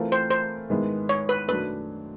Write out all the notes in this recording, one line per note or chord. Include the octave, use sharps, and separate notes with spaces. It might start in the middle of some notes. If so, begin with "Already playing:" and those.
Already playing: E3 A3 C4 F4 A#4
C5
C5
G#2 D#3 G#3 B3 E4
C#5
B4
F#2 D#3 F#3 A3 D4 B4